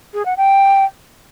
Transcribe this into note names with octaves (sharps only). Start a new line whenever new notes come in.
G#4
F#5
G5